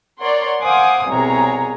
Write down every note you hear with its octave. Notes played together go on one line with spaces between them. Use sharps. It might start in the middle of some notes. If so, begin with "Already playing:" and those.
A#4 C#5 D5 F#5 C6
C5 F5 F#5 G#5 D6 D#6
C2 B2 G#4 C#5 A#5